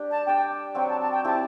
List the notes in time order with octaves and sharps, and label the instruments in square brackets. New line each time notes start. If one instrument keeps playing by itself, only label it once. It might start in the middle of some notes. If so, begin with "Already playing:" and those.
Already playing: [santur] G3 D4 G4
[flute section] A5
[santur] D4 G4 D5 [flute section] G5
[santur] F#3 C4 F#4 [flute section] G5
[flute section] A5
A5
G5
[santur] C4 E4 G4 [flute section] A5